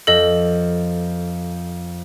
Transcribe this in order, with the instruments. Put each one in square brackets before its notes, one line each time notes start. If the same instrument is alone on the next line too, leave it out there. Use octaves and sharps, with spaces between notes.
[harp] F2 [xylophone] A4 D#5